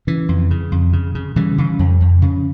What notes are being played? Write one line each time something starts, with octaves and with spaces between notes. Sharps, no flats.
C#3 E3
F2
C#3
F2
C#3
C#3
C#3 E3 G3
C#3
F2
F2
C#3